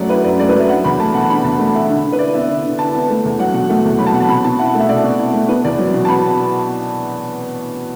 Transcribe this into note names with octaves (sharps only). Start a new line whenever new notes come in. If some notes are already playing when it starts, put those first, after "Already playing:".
Already playing: F#2 F#3 A3 D5 F#5
E4 B4
F#2 D5
A3 D5
B4
F#3 E5
D4 F#5
E2 B5
A3 A5
B2 F#5
D4 B5
E2 A5
A3
B2 E5
D3
D3
B4
E4 D5
B3 E5
D3
D3
E4 A5
B3
A3
E2
F#3 F#5
B2 F#5
A3
E2
F#3 B5
A5
B2 F#5
A5
B2 B5
B2 A5
E4 F#5
F#5
A3 E5
B2 D5
B2
E4
A3
B3 B4
E2 D5
F#3
B2
A5
B3 B5